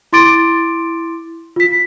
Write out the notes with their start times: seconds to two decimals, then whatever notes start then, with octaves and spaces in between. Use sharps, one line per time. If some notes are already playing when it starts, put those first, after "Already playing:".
0.13 E4 C6 D6 A6 D7
1.56 F4 B6